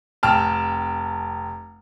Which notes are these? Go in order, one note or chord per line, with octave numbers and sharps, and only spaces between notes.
F1 G5 A5 F6